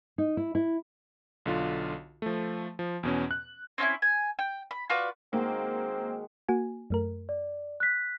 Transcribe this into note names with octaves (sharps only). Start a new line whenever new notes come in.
D#4
E4
E4
B1 D3 F4
F3 A3
F3
E2 B2 C#4
F#6
C4 C#4 D#4 E4
G#5
G5
B5
F4 F#4 B4 D5
D#3 G#3 A#3 C4 F#4
A#3 F#4 G#5
F#2 A3 A#4
D5
F#6 B6